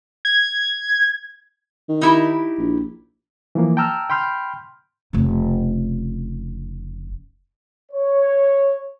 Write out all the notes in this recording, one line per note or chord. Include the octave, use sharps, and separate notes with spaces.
G#6
D#3
D#4 E4 G4
A#1
E3 F3 A#3
G5 A5 A#5 E6 F6
G5 B5 C6 F6 G6
F1 C#3
C#5